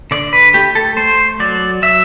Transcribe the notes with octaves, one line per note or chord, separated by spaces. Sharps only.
D3 D5
B4
A3 G4
A4
A3 C5
F#3 D5
F#3 E5